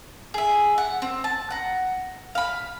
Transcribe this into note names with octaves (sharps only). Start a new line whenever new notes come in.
G#4 E5
F#5
C4
A5
F#5 A#5
F5 B5